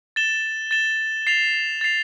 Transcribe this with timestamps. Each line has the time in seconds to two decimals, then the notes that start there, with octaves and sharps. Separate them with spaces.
0.16 A6 E7 G7
0.71 A6 E7 G7
1.27 A6 C7 F7
1.81 A6 C7 F7